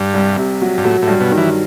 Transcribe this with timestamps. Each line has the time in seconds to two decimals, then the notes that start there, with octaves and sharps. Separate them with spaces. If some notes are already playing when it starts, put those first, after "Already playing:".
Already playing: G2
0.14 C2
0.37 C3
0.61 F#3
0.78 G2
0.85 A2 F#3
1.02 A2
1.07 G2
1.20 B2
1.32 D#3
1.37 E3